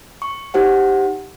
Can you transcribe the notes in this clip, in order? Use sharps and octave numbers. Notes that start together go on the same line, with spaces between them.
C#6
D#4 G4 C5 F#5